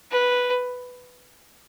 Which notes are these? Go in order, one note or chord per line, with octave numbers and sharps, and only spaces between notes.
B4